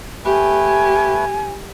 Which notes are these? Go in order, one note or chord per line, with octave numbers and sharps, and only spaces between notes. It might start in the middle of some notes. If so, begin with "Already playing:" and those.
A3 G4 B4 G#5